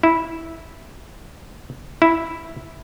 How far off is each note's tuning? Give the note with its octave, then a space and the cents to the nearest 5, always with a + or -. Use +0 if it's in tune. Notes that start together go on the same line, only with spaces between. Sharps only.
E4 -10
E4 -5